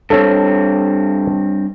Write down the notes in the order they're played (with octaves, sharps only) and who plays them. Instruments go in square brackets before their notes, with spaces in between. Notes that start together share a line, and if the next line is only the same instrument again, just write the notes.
[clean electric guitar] G2 C4 [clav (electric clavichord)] A4 C#5